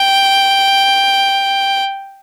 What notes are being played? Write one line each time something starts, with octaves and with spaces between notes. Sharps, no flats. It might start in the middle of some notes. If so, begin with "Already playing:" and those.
Already playing: G5